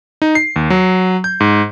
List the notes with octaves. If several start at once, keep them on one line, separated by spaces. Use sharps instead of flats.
D#4
C7
D#2
F#3
G6
G#2